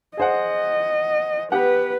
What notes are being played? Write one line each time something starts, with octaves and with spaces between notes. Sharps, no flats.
G#4 C5 D#5 F#5
B3 G4 B4 F#5